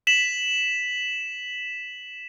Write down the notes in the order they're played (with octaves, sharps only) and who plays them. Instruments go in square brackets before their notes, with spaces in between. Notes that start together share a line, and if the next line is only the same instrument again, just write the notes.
[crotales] B6 E7 F#7